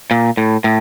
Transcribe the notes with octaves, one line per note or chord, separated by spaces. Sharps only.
A#2
A2
A2